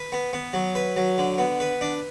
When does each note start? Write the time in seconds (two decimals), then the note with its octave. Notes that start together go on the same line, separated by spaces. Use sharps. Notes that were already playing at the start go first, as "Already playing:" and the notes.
Already playing: B4
0.12 B3
0.33 B3
0.54 F#3
0.75 B4
0.96 F#3
1.18 D3
1.38 B3
1.60 B4
1.81 D4